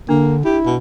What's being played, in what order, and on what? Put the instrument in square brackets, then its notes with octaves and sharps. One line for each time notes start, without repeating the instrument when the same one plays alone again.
[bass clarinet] D3 [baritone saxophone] A#3 [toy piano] D4
[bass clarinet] E4 [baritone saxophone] G4
[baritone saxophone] B2